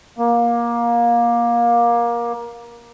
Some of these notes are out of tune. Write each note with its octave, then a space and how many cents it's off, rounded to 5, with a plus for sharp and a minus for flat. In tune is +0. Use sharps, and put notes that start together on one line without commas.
A#3 +20